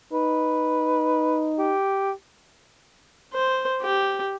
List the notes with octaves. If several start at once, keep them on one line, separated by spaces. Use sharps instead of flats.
D#4 B4
G4
C5
G4